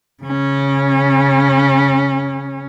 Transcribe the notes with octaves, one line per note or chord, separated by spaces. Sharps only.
C#3 C#4